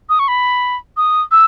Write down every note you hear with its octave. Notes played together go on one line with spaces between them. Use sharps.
D#6
C#6
B5
D#6
E6